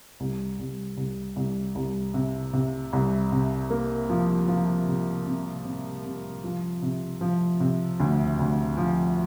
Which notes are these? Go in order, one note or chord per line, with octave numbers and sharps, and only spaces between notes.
C2
C2
C2
C2
C2
C3
C3
C2
C3
A#3
F3
F3
C3
C3
C3
C3
F3
C3
F3
C3
D2
D2
F3